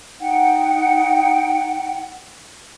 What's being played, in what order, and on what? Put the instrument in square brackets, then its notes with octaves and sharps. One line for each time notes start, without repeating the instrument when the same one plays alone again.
[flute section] D#4 F#5 G5